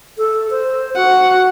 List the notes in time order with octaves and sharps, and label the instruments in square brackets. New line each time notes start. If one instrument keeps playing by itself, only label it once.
[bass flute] A4
C5
[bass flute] F#4 [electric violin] F#5